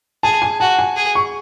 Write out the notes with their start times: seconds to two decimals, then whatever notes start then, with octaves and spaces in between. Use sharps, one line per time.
0.23 G#4 A5
0.42 G#5
0.60 F#4 A5
0.79 G#5
0.96 G#4
1.15 C#6